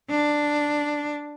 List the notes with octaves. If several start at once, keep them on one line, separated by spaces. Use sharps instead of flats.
D4